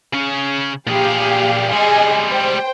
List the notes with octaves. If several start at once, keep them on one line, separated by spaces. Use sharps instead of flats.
C#3 C#4
A#2 G4 G#4 F5
G3 G#3 G#4 D#5
C5 G5